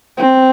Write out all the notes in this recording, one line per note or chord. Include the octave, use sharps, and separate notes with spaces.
C4